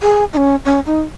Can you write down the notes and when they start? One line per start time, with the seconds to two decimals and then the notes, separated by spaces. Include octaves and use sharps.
0.02 G#4
0.33 D#4
0.37 C#4
0.65 C#4
0.86 D#4